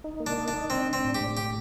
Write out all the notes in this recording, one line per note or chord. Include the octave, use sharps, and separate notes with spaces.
D#4
A#3
D4
D#4
D4
D#4
C4 D4
D4
C4
A2
G4
A2
G4